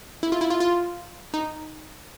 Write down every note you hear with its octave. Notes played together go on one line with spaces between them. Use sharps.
E4
F4
E4
F4
F4
D#4